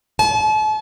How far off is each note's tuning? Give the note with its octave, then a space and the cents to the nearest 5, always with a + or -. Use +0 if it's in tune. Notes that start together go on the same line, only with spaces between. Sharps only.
A5 -40